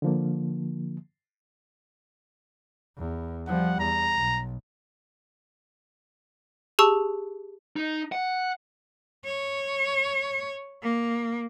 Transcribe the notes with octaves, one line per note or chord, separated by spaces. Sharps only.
D3 F3 A#3
E2
F3 G3 F#5
E2 A#5
B1
G4 G#4 A5 C#6 E6
D#4
F#5
C#5
A#3